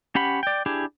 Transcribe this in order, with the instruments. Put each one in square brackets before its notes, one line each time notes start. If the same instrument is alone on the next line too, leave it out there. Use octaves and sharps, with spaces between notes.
[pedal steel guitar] C#4 G4 F#5 B5
D5 G5
D4 E4 G4 G#4